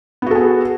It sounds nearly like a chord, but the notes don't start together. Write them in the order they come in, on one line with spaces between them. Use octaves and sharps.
B3 F#4 A4 G#4